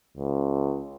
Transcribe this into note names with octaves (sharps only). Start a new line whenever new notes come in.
C#2